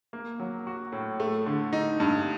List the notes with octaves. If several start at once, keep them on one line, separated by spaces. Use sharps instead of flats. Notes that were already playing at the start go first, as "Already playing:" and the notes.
A#3
F#3
F#4
A2
A3
D3
D#4
G2